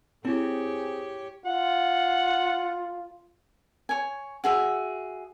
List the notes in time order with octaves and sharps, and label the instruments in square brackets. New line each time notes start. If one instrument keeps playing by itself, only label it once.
[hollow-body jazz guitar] C4 [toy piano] E4 [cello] G4 C#5 [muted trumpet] G#4
[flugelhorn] F4 [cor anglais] F#5
[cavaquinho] C#5 G#5
F#4 G#4 E5